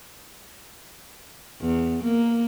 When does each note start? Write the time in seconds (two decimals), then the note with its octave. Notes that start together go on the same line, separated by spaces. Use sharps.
1.61 E2
2.04 A#3